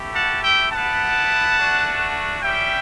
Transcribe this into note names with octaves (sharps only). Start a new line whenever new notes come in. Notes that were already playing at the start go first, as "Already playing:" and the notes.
Already playing: A3 E4 G4
F#5 A5
E5 G5
B3 E4 G4 F#5 A5
A3 D4 F#4
G3 C#4 G4 E5 G5